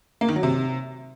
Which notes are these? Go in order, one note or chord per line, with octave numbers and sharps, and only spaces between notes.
A#3
D#3
F#3
C3